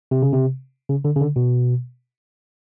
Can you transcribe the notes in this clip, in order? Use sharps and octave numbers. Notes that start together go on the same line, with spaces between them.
C3
C#3
C3
C#3
D3
C#3
D3
B2